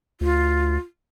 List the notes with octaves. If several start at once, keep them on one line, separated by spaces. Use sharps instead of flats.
D2 F4